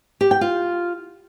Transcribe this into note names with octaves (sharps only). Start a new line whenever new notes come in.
G4
G5
F4